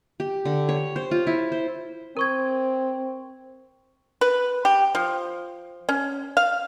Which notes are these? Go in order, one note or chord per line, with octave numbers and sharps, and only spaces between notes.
G4
D3
C#5
C5
F4
E4
C5
C4 A#4 C#6 G#6
B4
G4
F3
C#4
F5